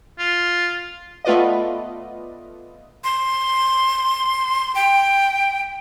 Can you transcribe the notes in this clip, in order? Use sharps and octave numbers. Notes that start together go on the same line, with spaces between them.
F4
A3 B3 F4 B4 D5 D#5
C6
G5